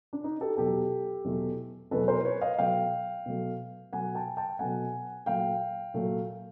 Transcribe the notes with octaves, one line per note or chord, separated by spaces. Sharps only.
D4
D#4
G4 A4
E2 B2 F#3 A3 G4 A4
E2 B2 F#3 A3
E2 B2 F#3 A3 A4 B4
A#4 C5
B4 C#5
D#5 F5
B2 F#3 A3 F5 G5
B2 F#3 A3
B2 F#3 A3 F#5 G#5
G5 A5
G5 A5
B2 F#3 A3 F#5 G#5
A#2 F#3 A3 F5 G5
A#2 F#3 A3